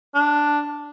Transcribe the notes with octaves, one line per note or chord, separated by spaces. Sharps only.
D4